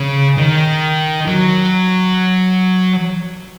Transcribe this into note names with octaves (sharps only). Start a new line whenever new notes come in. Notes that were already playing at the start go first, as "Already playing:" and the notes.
Already playing: C#3
D#3
F#3